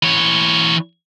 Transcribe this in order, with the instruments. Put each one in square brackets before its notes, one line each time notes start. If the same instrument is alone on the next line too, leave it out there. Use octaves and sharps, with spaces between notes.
[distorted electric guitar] E3 C#5